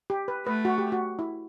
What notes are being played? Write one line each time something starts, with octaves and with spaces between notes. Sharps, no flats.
G4
B4
A3 B4
F#4
G4
F#4
E4